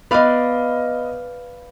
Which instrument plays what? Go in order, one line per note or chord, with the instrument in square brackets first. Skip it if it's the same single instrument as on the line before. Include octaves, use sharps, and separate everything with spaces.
[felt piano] B3 D#5 [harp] B4 D5 F5